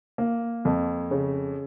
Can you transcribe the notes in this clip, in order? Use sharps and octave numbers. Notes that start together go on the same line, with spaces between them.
A#3
F2
C#3